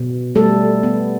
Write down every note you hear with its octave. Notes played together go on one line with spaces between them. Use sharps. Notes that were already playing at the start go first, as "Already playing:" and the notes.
Already playing: B2
G3 A3 A4
B3